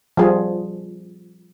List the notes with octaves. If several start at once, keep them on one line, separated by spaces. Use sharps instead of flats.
F3 G3 G#4